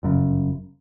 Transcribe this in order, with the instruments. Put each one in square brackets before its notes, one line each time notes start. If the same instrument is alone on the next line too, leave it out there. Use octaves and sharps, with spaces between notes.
[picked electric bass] G1 F#2 C#3